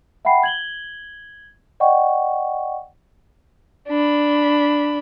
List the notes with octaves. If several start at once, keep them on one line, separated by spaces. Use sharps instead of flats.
E5 F#5 G5 B5 C7
G#6 F#7 G7
D5 D#5 F#5 G5 C#6
D4 B5